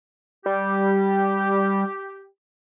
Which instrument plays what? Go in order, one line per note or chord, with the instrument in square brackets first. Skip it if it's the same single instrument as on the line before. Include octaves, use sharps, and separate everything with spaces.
[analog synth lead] G3 [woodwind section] G4